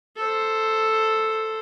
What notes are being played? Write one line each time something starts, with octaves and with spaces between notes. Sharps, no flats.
A4 C5